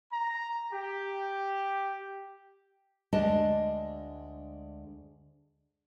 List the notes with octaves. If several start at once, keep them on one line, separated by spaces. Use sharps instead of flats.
A#5
G4
D2 G#3 D4 D#5 A5